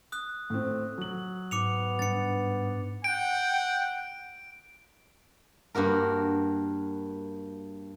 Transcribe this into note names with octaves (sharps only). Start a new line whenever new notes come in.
D#6 F#6
A2 C4
F#3 F#7
G#2 B3 D6 C#7 F7
G2 A6 C#7
F#5 G5 D7
G2 A#3 F#4 A#4